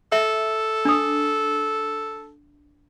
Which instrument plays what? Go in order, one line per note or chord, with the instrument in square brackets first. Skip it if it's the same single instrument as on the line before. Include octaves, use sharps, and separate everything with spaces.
[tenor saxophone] A4 [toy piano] E5
[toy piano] D4 D#6